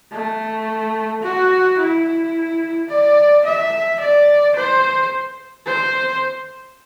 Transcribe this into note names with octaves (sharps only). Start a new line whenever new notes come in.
A3
F#4
E4
D5
E5
D5
C5
C5